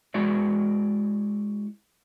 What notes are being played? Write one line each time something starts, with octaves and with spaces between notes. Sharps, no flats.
G#3 E4 F#4 D5